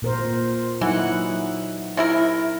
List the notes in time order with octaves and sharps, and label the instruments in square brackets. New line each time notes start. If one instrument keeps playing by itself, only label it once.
[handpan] A#2 A#4 C5
[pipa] E3 [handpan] F#3 D#4 F#5
[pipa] C3 E4 A#4